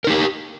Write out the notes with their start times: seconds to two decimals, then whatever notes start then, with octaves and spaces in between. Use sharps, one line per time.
0.04 A#4
0.07 D#4
0.10 G4